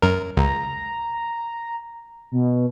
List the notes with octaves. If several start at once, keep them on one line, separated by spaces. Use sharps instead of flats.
F#2 A#4
C#2 A#5
B2